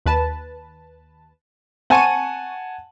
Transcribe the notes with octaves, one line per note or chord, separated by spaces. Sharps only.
D#2 B4 A5
C4 F#5 G#5 A5 C#6 D#7